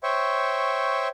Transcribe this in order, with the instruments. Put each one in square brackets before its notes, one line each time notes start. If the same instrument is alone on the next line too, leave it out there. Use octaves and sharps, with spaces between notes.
[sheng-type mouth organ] C5 C#5 E5 G5 C#6